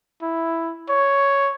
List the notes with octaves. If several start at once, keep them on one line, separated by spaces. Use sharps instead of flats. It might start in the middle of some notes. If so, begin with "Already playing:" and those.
E4
C#5